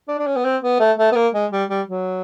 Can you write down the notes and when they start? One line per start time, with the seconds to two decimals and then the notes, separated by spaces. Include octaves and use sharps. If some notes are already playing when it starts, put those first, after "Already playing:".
0.08 D4
0.18 D4
0.26 C#4
0.36 B3
0.44 C4
0.63 B3
0.80 A3
0.98 A3
1.12 B3
1.15 A#3
1.34 G#3
1.52 G3
1.69 G3
1.88 F#3